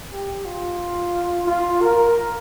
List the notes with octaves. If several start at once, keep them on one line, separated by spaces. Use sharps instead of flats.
G4
F4
F4
A#4